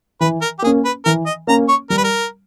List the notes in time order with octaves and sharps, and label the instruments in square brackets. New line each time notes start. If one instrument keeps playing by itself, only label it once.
[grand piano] E3 [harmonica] B4
[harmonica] A#4
G4
[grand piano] A#3 [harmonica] G#4
[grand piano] C#4
[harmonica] B4
[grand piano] E3 [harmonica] A#4
[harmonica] D#5
[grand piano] A#3 C#4 [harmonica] A#5
[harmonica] C#5
[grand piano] G3 [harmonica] A#4
[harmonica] B4
A#4